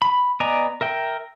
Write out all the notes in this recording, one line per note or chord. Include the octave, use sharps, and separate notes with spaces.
B5
B3 D5 D#5 G#5 A#5
A#4 E5 G5